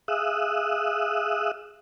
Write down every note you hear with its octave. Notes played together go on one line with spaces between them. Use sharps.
G#4 E5 F5 D#6 E6 F#6